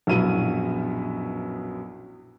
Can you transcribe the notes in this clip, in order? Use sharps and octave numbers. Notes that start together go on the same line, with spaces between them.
A#1 F#2 B2 B3 E4 D#7